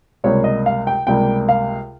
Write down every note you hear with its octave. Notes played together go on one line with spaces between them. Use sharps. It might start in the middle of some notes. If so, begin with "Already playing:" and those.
C#2 C3 G3 A#3 C#5
D#5
F5
G5
C#2 C3 G3 A#3 G5
F5